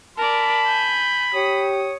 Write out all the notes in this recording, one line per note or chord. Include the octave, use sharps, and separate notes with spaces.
A#4 D5 A5 B5
G#5 G6
G4 C#5 D#6